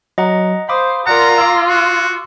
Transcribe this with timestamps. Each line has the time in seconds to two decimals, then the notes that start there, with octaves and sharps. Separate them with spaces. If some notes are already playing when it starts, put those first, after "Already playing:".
0.18 F#3 D#5 F#5 A#5
0.69 C5 F5 B5 D6 D#6
1.07 F4 A#4 D5 F#5 A#5
1.38 F5 D6 E6 C7
1.68 F#4